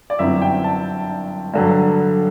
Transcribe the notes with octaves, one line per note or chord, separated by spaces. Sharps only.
D5
G1 F#2 F#3 C4 E4 E5
G5
A5
G2 D3 F#3